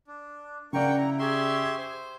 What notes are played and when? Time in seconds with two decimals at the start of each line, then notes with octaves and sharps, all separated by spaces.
0.07 D4
0.73 C#3 A#3 D5 F#5 G5 A#5 C#6
0.97 E4 A#5
1.19 G4 G#4 E5 C6 C#6
1.78 C5